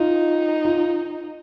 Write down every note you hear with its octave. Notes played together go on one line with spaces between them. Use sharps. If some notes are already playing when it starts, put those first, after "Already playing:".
Already playing: D#4 F4
F4